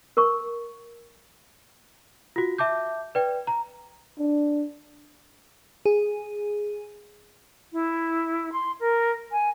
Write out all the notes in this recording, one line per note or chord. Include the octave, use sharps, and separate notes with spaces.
A#4 C#6
F4 F#4
E5 A5 D6 G6
B4 D5 G5
A#5
D4
G#4
E4
C6
A#4
G#5